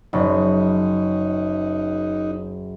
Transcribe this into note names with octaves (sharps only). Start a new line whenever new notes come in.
F#1 C#3 D#4